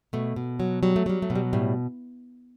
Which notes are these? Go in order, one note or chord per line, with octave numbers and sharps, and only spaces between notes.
B2 A3
B2
F#3
F#3 G3
A3
F#3 G3
A3
B2
G3
A2 G3